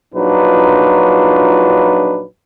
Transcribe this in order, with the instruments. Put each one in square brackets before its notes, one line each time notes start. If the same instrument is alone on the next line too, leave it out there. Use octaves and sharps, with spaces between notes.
[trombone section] A#1 F#3 D4 D#4 F4 B4